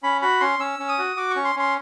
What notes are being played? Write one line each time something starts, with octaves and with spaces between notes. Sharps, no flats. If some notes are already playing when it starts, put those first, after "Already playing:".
C#4 B5
F#4 B5
C#4 C6
C#4 E6
C#4
D#6
F#4
F#4 D6
C#6
C#4
C6
C#4 C6